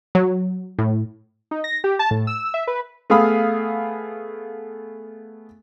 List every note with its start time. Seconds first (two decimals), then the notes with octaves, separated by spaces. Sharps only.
0.15 F#3
0.79 A2
1.51 D#4
1.64 A#6
1.84 G4
1.99 A5
2.11 A2
2.27 E6
2.54 E5
2.67 B4
3.10 A3 B3 G#4 F5 B5 D#6